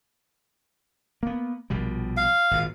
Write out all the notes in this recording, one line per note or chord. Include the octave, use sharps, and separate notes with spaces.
A#3 B3
A#1 B2 G3
F5
G#1 A#2